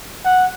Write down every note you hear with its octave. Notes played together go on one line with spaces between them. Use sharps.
F#5